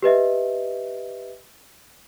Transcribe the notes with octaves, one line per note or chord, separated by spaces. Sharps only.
G4 B4 D#5 E5